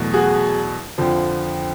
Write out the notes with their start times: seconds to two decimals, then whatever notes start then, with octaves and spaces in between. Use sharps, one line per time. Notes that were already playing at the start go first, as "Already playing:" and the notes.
Already playing: E2 B2 F#3 A3
0.13 F#4 G#4
0.98 F2 D3 F3